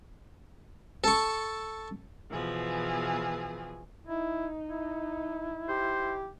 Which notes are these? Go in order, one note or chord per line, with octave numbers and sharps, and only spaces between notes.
A4 C#6
B2 E3 F3 G#4
D#4 E4
E4
G4 C5